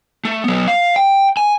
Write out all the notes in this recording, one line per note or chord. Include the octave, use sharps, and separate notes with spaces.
A3
F#3 B3
F5
G5
G#5